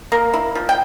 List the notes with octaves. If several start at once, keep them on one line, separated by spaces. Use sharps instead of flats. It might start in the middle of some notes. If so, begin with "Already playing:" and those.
A#3
E4
F3
G5